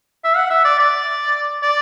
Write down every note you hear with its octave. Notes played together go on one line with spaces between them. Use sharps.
E5
F#5
E5
D5
D5
D5